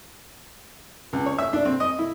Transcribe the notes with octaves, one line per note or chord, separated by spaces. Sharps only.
C#2
C#5
E5
D4
C4
D#5
E4